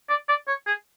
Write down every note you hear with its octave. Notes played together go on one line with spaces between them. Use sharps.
D5
D5
C#5
G#4